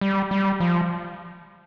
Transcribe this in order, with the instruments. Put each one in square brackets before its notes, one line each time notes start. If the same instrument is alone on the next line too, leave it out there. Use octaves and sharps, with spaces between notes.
[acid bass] G3
G3
F3